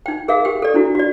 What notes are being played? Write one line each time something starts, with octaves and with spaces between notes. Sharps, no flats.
D#4 G5
G#4 A#4 E5 F5
G4 G5
A4 D5
D4 E4 F#4
F#4 D5